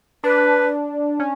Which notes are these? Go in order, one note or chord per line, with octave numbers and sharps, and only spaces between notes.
D4 B4
C#4